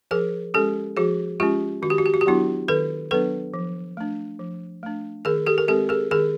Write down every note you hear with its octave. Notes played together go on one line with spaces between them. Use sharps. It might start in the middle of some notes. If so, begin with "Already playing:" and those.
F3 G#4 A#4
G#3 C#4 G4 A4
F3 F#4 G#4
G#3 C#4 F4 G4
D#3 F#4
G4
F#4
G4
F#4
G4
F#3 B3 D4 E4 F#4
D#3 A4 B4
F#3 B3 D4 A4 B4
F3
A3 D4
F3
A3 D4
D#3 G#4 A#4
G4 A4
A#4
G#3 C4 G4 A4
G#4 A#4
D#3 G#4 A#4